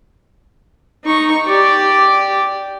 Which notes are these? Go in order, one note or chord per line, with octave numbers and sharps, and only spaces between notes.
D#4 C#6
G4 D5